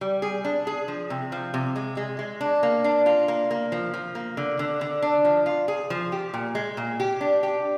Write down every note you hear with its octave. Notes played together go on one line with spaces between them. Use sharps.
G3
G#4
D4
G#4
F3
C3
F3
C3
G#3
G#3
G#3
D4
A#3
D4
F4
A#3
A#3
F3
F3
A#3
D3
D3
D3
D4
F3
F4
G#4
F3
G4
A#2
G#3
A#2
G4
D4
G4